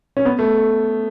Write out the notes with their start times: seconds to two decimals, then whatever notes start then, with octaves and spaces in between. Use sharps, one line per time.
0.17 C#4
0.25 B3
0.39 A3